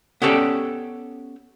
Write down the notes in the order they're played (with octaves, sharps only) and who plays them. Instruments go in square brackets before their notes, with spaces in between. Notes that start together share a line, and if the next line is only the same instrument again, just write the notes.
[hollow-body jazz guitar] B3 C#4 G4 A4 D5 G5